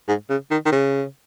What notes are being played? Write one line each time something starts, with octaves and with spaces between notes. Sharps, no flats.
G#2
C#3
D#3
D#3
C#3